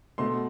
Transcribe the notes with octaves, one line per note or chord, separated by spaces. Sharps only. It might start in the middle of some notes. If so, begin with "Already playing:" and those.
B2 A3 C6